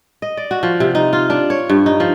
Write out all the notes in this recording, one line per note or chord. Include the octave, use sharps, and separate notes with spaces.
D#5
D5
F#4
F3
C3
D#4
F4
D4
C#5
G2
D#4
F3